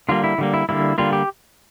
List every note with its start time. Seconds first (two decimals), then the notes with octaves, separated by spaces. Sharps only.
0.09 D3 G3 A#3 F4
0.24 E4
0.38 D3 G3 A#3
0.54 E4
0.69 D3 G3 A#3 E4
0.98 D3 G3 A#3 F4
1.13 G4